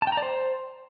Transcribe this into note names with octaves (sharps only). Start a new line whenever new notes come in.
A5
G5
A#5
D5
C5